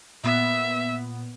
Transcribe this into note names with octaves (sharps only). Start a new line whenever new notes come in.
A#2 B3 E5